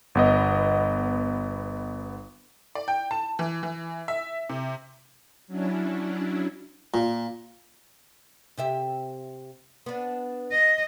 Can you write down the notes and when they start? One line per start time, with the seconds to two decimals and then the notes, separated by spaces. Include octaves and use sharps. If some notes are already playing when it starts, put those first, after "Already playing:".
0.15 G1 B3 D#5
2.75 D5
2.88 G5
3.11 A5
3.39 E3
3.63 E3
4.08 E5
4.49 C3
5.47 F#3 C#4 D4 E4
6.94 A#2
8.57 C3 G4 E5
9.86 B3 D4
10.51 D#5